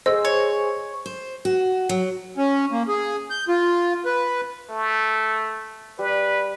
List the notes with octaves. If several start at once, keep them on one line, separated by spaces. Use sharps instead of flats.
G#4 C5 D#5 E6
C#5
C5
F#4
F#3
C#4
A#3
G#4
G6
F4
B4
A3
G3 B4